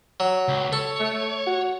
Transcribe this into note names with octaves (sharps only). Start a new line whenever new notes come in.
F#3
C#2
A4 C#5
A3
F#4